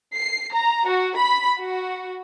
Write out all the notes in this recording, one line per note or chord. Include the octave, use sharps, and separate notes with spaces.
C7
A#5
F#4
B5
F#4